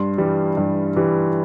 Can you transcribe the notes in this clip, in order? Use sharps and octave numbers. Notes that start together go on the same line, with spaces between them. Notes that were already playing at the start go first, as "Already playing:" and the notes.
Already playing: G2 C6
E3 G3
G2
E3 G3